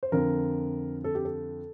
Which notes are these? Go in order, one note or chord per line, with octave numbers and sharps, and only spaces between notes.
C5
F2 D3 F3 A#4
A4
G4
A4